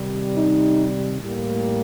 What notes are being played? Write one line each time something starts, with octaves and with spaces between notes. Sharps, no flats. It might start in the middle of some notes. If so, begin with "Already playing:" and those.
Already playing: C3 D#3 G3
D#4
A2 G3 A#3